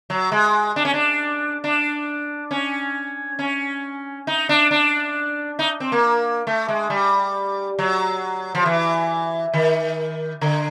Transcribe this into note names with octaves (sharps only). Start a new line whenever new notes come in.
F#3
G#3
D4
C#4
D4
D4
C#4
C#4
D#4
D4
D4
D#4
C4
A#3
A3
G#3
G3
F#3
F3
E3
D#3
D3